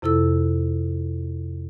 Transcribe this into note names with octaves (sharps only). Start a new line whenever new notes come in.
F2 C3 E4 A4 E6